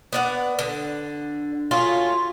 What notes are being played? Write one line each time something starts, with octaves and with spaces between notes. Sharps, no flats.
B3 D5 F#5
D3
F#3 A3 F4 G#4